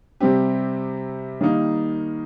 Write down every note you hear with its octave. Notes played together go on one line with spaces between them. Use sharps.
C3 G3 C4 G4
D#3 G3 A#3 D#4